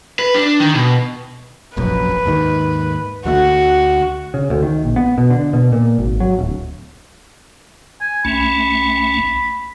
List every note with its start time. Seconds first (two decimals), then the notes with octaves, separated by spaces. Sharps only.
0.19 B4
0.35 D4
0.60 D#3
0.74 B2
1.77 F1 A#1 F#2 B4
2.26 D#2 G#2 D#3
3.25 D2 D3 A3 F#4
4.34 C#3
4.50 D2
4.63 D#3
4.84 A#1
4.96 B3
5.18 B2
5.30 D3
5.53 B2
5.72 A#2
5.98 G#1
6.20 F#3
6.39 D1
8.01 G#5
8.25 C2 A3 C#4 B5